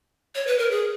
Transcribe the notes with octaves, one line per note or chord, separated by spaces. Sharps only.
C#5
B4
A#4
G#4